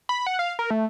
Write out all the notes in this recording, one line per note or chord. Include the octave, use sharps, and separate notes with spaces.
B5
F#5
F5
A#4
A3